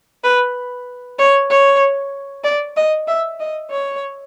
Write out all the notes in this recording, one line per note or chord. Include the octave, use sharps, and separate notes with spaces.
B4
C#5
C#5
D5
D#5
E5
D#5
C#5